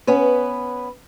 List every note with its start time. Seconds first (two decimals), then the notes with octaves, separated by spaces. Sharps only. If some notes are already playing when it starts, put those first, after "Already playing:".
0.07 B3 C#4 B4